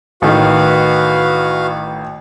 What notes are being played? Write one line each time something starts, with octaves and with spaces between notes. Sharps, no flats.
A1 D#3 F#4 B4 F5